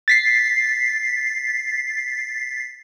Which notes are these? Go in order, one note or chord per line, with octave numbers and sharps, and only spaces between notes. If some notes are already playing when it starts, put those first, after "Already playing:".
A6 B6 C7